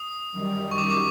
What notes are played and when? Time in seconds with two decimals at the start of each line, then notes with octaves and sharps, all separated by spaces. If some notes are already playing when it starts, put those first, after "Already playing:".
Already playing: D#6
0.32 F#2 D#3 G3
0.71 C#6
0.78 D6
0.90 D6